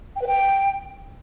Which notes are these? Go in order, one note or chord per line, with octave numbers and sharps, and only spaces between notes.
G5
B4
G5